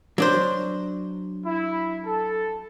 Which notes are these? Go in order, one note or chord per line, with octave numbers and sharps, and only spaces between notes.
F#3 D4 C5
E4
A4